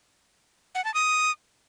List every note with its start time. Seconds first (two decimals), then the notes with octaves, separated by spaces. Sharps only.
0.75 F#5
0.85 A5
0.94 D#6